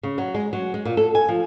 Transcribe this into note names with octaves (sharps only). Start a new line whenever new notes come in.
C#3
F#3
G#3
F#3
G#3
A#2
A4
G#5
F3